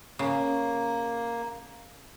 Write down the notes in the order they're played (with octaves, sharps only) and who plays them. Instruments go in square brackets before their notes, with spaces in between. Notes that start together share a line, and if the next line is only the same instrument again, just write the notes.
[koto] C#3 [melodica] A#3